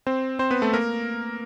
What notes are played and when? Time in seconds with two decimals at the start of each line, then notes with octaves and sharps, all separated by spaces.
0.07 C4 C5
0.39 C4 C5
0.50 B3 B4
0.62 A3 A4
0.73 A#3 A#4